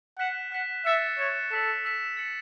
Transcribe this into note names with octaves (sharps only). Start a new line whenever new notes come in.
F#5 F#6 B6 E7
F#5 F#6 B6 E7
E5 F#6 A6 C#7 E7
C#5 F#6 A6 C#7 E7
A4 E6 B6 E7
E6 B6 E7
A6 C#7 F#7